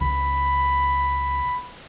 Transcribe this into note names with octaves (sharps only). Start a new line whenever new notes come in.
C#2 B5